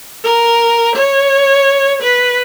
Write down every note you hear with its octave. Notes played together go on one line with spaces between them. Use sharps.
A#4
C#5
B4